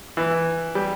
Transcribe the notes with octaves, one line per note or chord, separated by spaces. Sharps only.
E3
G3